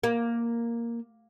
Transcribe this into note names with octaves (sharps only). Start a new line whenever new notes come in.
A#3